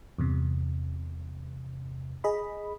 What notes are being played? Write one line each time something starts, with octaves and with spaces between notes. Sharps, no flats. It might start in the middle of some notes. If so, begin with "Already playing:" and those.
E2 G2 C3
G#4 D#5 B5